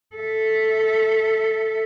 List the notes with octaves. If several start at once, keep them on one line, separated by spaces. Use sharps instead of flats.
A4 E5